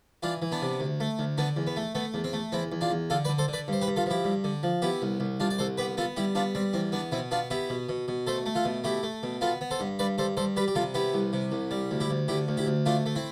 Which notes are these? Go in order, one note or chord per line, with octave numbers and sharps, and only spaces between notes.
E3 D4 F4
E3
B3 D4
C3
D2
A3
D2
D3 B3 D4
E2
B3
A3
A3 B3
E2
C4
A3
E2 C4 E4
E2
D4 F4
E2
D3 F4 A4
B4 D5
D3
A4 C5
D3
B4 D5
G2 C5
G4 B4
G2
F4 A4
F3 E4 G4
G2
D3
F3
B3 E4 G4
C2
C2
C2 D4 F4
D5
C2 A4 C5
B3 G4 B4
B3 F4 A4
G3 E4 G4
B3 D4 F4
G3 C4
E2 C4
B3 D4
B2 C4 E4
B3 D4 F4
B3 E4 G4
B2
B2
B2
A3 A4 C5
A3
F4 A4
B2
A3 E4 G4
A3
B2
B3 F4 A4
B3
A4 C5
G2
G2 B4 D5
G2 A4 C5
G2 A4 C5
G3 G4 B4
G4
C3 F4 A4
B3 E4 G4
C2
C3
C2
G3
D2
E4 G4
D2
D3 E4 G4
D2
E4 G4
D2
A3 D4 F4
A3
C4 E4